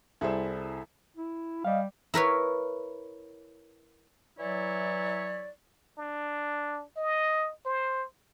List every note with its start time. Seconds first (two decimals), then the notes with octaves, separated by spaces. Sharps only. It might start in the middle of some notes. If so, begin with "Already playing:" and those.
0.21 C2 E4 G#4 A4 C5 E5
1.17 E4
1.65 G3 D#5 F5
2.14 E4 A#4 B4 C#5
4.39 E3 F#3 E4 C#5 D5
5.98 D4
6.97 D#5
7.66 C5